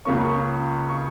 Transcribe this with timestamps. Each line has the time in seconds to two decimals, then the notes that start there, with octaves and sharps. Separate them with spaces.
0.05 C#2 C#3 A#3 C#4 C#6
0.89 C#6